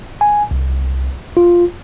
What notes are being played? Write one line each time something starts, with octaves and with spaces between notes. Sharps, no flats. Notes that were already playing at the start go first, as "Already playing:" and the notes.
G#5
C2
F4